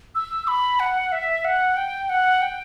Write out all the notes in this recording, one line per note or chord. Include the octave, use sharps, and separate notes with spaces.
E6
B5
F#5
E5
F#5
G5
F#5
G5